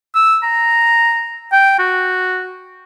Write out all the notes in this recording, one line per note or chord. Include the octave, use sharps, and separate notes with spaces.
E6
A#5
G5
F#4